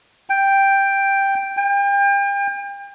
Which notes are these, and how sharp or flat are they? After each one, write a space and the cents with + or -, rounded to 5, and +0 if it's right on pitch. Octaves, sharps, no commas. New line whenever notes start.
G5 +5
G5 +35